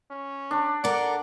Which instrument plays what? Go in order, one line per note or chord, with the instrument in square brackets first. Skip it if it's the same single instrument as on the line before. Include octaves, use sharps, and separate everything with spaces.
[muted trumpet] C#4
[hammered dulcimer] D4
[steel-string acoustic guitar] A4 A#4 [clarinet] D5 [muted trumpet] F#5